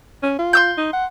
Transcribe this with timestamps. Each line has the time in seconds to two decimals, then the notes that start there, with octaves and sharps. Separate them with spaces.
0.23 C#4
0.39 F4
0.53 C6 E6 G6
0.78 D#4
0.93 F#5